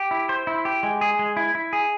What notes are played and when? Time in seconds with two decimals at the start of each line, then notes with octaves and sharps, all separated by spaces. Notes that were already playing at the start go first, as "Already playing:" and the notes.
Already playing: G4
0.11 E4
0.29 C5
0.47 E4
0.65 G4
0.83 G#3
1.01 G#4
1.19 G#3
1.37 E4
1.55 E4
1.73 G#4